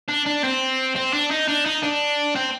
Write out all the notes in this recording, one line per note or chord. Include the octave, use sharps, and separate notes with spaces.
D4
D4
C4
C4
D4
D#4
D4
D#4
D4
C4